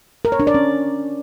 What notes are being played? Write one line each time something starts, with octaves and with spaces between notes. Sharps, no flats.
A#4
C#5
D4
D5
C#4